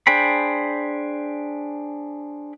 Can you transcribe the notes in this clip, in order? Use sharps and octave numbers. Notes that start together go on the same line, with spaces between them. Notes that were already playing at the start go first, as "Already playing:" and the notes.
D4 G#4 C5 G5 B5